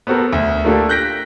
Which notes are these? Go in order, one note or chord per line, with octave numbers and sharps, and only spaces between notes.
B3 C4 F#4 A4 A#4
D2
A3 A#3 D4 F4 G4 A4
F#6 G6 A#6 B6 D7